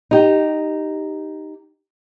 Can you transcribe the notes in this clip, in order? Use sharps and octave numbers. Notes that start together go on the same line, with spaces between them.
D#4 G4